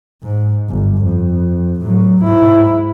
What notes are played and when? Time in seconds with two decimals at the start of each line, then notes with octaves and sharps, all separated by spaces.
0.23 G#2
0.70 G1
1.03 F2
1.81 A2 F#3
2.22 G#2 E4